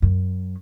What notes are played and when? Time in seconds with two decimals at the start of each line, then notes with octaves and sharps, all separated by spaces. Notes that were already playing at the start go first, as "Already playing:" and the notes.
0.02 F#2